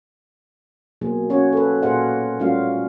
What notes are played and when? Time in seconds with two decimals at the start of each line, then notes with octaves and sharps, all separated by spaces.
1.01 B2 F#3 A#3 G#4
1.30 C#4 F#4 C#5
1.53 A4 B4
1.83 A#2 G#4 C5 D#5 F5 F#5
2.39 G3 A3 C#4 F4 F#4 F5